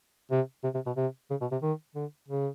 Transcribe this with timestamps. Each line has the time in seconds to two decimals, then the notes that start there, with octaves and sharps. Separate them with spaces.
0.31 C3
0.63 C3
0.74 C3
0.86 B2
0.96 C3
1.30 C#3
1.41 B2
1.52 C3
1.62 D#3
1.95 D3
2.28 C#3